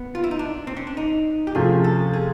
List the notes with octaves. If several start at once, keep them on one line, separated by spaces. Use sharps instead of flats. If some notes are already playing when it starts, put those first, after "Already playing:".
Already playing: B3
F4
E4
D#4
D4
C4
C#4
D4
D#4
G4
C3 F3 A3 C#4 F4 G#4
A4
G#4